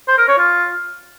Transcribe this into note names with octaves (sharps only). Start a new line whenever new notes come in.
C5
A#4
C#5
F4